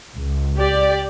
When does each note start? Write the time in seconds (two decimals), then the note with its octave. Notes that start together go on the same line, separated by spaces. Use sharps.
0.16 C#2
0.58 G4 D5